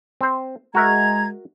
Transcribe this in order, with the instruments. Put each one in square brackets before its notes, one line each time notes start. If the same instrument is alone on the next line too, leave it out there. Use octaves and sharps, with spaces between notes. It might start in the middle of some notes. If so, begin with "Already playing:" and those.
[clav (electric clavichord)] C4 C5
[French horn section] G#3 [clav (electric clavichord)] F#4 A#4 E5 [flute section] A#5 G#6